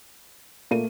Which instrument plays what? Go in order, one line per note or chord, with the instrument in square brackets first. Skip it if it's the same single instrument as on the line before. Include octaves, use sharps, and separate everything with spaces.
[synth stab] A#2 [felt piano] A3 A#3 D#7